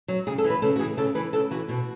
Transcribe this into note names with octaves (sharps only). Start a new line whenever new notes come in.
F#3
C#3 G#4
A4
E3
B4
C#3 A4
F#4
E3 G#4
C#3 A4
E3 B4
C#3 A4
E3 F#4
B2 F#4